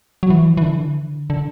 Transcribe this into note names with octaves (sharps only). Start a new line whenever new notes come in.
F#3
E3
E3
D3
D3